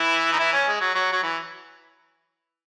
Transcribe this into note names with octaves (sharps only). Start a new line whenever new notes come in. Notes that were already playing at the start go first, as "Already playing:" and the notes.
Already playing: E3 E4
D#4
E3 E4
C#4
G#3
F#3
F#3
F#3
E3